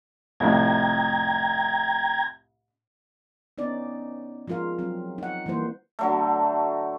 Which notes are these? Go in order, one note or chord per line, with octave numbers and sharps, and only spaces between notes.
C2 F2 A2 G5 A#5 G#6
B3 C#4 D#4 D5
F3 G#3 F4 A#4 F5
F#3 C4
D#4 F#5
E3 G3 A#3 C5
D3 F#3 A3